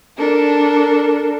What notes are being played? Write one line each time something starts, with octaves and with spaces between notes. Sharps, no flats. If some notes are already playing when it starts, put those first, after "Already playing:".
D4 A4 A#4